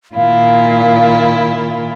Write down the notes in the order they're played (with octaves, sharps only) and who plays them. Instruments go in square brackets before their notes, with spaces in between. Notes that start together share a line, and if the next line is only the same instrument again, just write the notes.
[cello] A#2 [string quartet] D#3 E4 F4 [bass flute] F5